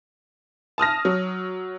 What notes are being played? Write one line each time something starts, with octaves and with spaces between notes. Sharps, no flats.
A5 D#6 F6 A#6
F#3